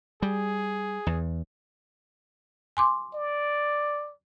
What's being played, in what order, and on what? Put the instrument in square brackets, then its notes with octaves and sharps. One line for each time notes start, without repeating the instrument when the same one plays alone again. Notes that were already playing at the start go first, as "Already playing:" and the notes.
[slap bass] G3 [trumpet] G#4
[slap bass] E2
[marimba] G#5 C6 D6
[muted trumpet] D5